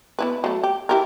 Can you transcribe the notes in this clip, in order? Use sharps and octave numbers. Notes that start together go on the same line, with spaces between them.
B3 E4 B4
F#3 A3
G4
E4 G4 A#4